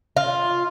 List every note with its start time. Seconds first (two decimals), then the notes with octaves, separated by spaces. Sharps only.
0.17 F4